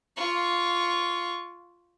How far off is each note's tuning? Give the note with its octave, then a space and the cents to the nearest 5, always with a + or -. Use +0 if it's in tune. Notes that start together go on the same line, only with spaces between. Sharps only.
F4 +0 C#6 +15